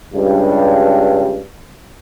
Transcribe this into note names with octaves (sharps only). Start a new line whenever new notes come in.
C#2 G2